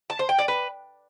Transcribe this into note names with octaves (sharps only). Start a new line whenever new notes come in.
A5
C5
G5
D5
B4